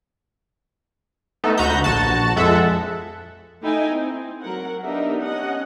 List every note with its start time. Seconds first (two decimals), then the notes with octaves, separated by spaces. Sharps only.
1.44 A3 B3 D#4 A4
1.58 D2 F#4 B4 A#5 G6
1.84 A#1 F#4 A5
2.36 F2 G#3 A4 E5 F#5
3.61 A3 D#4 E4 G5 G#5
3.91 C4
4.40 F#3 A#4 F#5
4.83 B3 D4 D#4 G4 A#4 E5
5.20 C#4 D#5 F#5